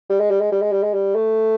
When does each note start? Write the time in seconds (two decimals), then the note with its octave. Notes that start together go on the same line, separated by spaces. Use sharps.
0.10 G3
0.20 G#3
0.31 G3
0.41 G#3
0.52 G3
0.62 G#3
0.72 G3
0.83 G#3
0.94 G3
1.15 A3